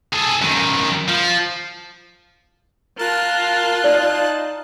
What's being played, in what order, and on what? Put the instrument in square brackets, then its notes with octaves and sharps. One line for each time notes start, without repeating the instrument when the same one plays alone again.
[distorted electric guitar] G#4 A4
F#2 D#3
F3
[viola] F4 [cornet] A#4 [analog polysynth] A5 F#6
[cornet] D#4 [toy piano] D5